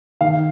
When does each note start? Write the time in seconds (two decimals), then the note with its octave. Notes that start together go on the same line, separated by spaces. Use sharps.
0.21 D#3 F5